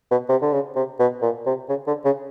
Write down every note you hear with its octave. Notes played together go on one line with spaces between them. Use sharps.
B2
C3
D3
C#3
C3
B2
A#2
C3
C#3
D3
C#3